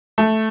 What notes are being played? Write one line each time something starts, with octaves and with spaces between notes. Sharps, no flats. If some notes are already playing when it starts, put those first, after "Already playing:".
A3